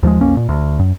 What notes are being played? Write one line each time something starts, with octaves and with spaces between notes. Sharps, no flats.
D#2 F3 G3 G#3
B1 F2 A#3 C#4
A#2
D2
F#2